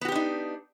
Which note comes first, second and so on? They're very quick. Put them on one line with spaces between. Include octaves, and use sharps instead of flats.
B3 F#4 G4 D4 D#4